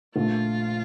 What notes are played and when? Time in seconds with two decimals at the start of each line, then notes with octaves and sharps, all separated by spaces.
0.16 A#1 A#2 A3 F4